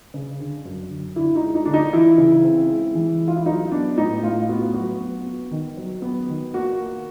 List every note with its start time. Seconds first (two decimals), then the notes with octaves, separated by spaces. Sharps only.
0.14 C#3
0.40 D3
0.65 F#2
0.90 D3
1.16 D3 E4
1.36 D#4
1.41 G#3
1.55 D#4
1.65 D3 D4
1.74 D#4
1.93 E3 E4
2.18 C#3
2.44 C4
2.69 G#3
2.95 E3
3.21 G#3
3.28 F4
3.36 E4
3.46 F#3 D#4
3.71 B3 D4
3.98 A2 D#4
4.23 A2 F4
4.49 B3 F#4
4.74 F#3 F#4
5.00 B3
5.26 B3
5.51 D#3
5.77 F#3
6.02 B3
6.28 D#3
6.53 A#3 F#4
6.78 A#3